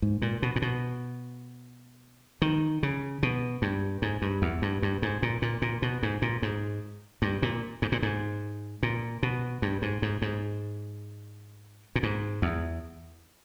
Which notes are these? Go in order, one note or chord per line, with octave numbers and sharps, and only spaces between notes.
G#2
A#2
B2
A#2
B2
D#3
C#3
B2
G2
G#2
G2
E2
G2
G2
G#2
A#2
A#2
A#2
B2
G#2
A#2
G#2
G2
A#2
G#2
A#2
G#2
A#2
B2
G2
G#2
G#2
G#2
A#2
G#2
E2